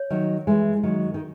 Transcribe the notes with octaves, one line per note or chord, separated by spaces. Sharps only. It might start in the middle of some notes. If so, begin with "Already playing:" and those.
Already playing: C#5
D#3 F#3
E3 G#3
D#3 F#3
D#3